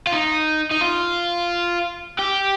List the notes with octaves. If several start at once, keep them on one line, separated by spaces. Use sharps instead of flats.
F4
D#4
D#4
F4
G4